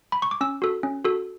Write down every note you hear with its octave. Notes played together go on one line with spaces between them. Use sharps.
B5
C#6
D6
C#4 E6
F#4 A4
C#4
F#4 A4